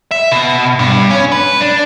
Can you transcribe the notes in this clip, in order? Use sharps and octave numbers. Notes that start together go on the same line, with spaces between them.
E5
B2
G2
C#4
B4
D4